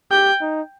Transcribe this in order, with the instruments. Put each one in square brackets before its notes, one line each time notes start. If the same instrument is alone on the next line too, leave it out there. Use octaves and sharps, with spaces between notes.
[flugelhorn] G4 [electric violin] G5
[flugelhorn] D#4